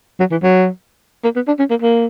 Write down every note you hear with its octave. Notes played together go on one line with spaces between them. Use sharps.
F#3
E3
F#3
A#3
B3
D4
C#4
A#3
A#3